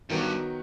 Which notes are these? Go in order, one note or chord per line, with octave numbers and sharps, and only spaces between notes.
G2 D#3 F#3 B3 F#4